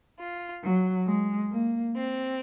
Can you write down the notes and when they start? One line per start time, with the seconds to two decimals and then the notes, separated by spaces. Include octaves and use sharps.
0.19 F4
0.64 F#3
1.07 G#3
1.51 A#3
1.95 C4